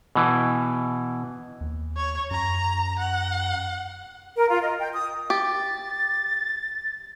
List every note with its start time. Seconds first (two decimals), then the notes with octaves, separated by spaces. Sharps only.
0.15 B2 E3
1.61 D#2
1.96 C#5
2.31 F#2 A#5
2.99 F#5
4.36 A#4
4.49 F4
4.62 D#5
4.79 G5
4.93 D#6
5.30 G4 A6